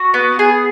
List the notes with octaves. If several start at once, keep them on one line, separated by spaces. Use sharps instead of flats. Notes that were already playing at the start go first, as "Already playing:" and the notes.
Already playing: F#4
B3
G#4